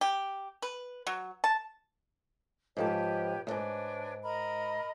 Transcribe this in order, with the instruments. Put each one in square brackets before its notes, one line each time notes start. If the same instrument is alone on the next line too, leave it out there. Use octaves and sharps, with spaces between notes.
[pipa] G4
B4
F#3
A5
[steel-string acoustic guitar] G#2 F3 A5 [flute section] G4 B4 C#5
[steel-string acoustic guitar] E2 G#2 [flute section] D4 B4 C#5
[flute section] A#4 D#5 B5